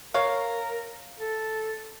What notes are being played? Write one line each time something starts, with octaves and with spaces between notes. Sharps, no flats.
A#4 C#5 F5
A4